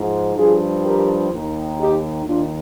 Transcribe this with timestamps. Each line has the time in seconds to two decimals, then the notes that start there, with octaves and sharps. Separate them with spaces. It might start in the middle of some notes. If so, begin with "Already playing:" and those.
Already playing: G#2 F3
0.36 G2 F3 F4 G#4
0.83 G4 A#4
1.32 D#2 D#3
1.78 D#4 G4
2.26 D#2 D#3 D4 F4